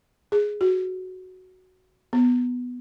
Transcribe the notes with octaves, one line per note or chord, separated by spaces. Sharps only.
G#4
F#4
B3